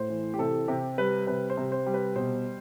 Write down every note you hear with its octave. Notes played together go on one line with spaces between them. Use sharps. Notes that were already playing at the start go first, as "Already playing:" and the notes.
Already playing: A2 C5
E3
G4
C3 A4
C3 G4
G3 B4
C3 B4
C5
C3
C5
G3
B4
B2 C5